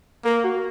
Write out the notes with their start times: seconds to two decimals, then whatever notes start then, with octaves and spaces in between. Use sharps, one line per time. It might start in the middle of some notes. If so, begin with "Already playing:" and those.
0.24 A#3 A#4
0.44 F#4